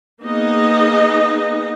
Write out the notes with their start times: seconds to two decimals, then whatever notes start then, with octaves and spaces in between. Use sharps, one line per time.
0.21 A#3 B3 D#4 G#4 D#5